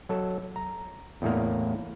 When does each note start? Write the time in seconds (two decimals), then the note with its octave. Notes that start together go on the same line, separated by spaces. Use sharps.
0.09 F#3 A4
0.56 A#5
1.22 E2 A2 A#3